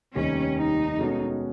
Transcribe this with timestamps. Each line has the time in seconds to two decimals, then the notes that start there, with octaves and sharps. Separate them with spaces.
0.15 F1 D#2 D#3 G3 C#4
0.57 D#4
0.98 B2 G#3 C#4 F#4 A4